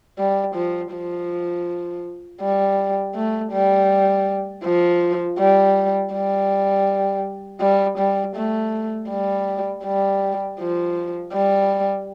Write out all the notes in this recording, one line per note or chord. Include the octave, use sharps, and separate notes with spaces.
G3
F3
F3
G3
A3
G3
F3
G3
G3
G3
G3
A3
G3
G3
F3
G3